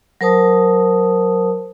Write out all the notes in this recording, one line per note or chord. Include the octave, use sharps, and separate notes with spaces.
F#3 A#4 C5 A5 D#6